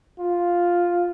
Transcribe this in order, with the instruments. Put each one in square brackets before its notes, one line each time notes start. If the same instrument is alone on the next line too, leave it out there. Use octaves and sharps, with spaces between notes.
[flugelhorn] F4